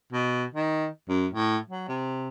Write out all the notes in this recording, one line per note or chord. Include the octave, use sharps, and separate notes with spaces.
B2
D#3
F#2
A2
F#3
C3